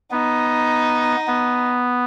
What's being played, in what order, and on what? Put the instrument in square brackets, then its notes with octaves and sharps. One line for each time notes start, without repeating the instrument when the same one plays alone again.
[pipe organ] B3 [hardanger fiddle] D#4
[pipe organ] B3